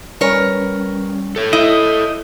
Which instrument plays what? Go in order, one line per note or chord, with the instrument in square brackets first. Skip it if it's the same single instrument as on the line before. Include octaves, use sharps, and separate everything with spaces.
[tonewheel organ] G3 C#4 [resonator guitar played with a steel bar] A#4 B4 C#5
[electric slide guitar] A4 C#5 [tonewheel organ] G6
[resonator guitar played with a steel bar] E4 [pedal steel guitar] D#5